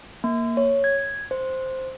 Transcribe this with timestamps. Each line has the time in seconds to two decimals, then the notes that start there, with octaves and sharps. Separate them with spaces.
0.24 A#3
0.57 C#5
0.84 G#6
1.31 C5